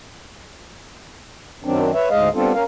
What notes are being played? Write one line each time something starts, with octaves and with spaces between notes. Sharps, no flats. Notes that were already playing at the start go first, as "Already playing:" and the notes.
F#2 D#3 F#3 C4 D4
B4 C#5 E5
D2 G#2 G#3 G#4 D#5 F5
G3 B3 C4 D4 F4 A4
C#4 A#4 F5